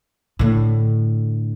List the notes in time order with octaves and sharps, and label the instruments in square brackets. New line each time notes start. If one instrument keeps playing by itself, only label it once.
[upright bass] A2 D3